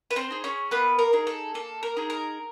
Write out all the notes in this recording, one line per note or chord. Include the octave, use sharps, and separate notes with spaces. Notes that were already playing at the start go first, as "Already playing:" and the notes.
B4
C4 C5
D#4 G#4
C#4 C#5
A#3 B3 B4
A#4
D#4 G#4
A4
A#3 A4
A#4
D#4 G#4
A#4